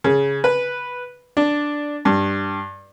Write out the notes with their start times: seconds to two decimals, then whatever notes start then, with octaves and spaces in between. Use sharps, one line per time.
0.04 C#3
0.44 B4
1.37 D4
2.05 G2